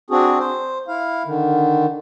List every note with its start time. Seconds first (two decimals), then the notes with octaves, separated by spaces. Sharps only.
0.10 C4 D4 F#4 G#4
0.40 C5
0.88 E4 F5
1.25 D3 D#3